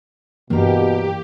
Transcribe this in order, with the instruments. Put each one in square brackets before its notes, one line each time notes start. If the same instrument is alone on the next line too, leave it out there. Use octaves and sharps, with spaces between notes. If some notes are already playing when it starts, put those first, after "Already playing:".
[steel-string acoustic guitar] G2 A#4 [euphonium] B2 [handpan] E3 A#3 [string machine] G4